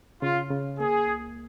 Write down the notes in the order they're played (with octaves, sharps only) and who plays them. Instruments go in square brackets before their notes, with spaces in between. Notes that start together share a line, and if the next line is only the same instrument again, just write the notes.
[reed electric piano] C#3 [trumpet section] F4
[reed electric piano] C#3
[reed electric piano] A#3 [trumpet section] G#4
[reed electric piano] C#2